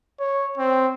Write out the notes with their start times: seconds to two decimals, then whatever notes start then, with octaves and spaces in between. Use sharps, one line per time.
0.19 C#5
0.57 C4